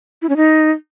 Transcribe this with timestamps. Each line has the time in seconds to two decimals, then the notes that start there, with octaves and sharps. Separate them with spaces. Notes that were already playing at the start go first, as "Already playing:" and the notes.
0.22 E4
0.29 C#4
0.37 D#4